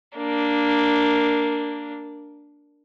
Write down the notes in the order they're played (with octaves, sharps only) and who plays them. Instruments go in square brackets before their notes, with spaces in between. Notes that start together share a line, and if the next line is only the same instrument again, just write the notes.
[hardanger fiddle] A#3 D4